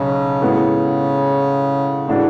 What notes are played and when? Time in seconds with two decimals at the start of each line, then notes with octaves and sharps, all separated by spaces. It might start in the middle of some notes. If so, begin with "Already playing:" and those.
Already playing: B1 C#3 F#3
0.41 A2 G#3 B3 F#4
2.07 A2 E3 G#3 D4 F#4